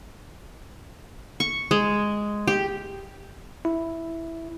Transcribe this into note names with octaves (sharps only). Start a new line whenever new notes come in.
C#6
G#3
G4
E4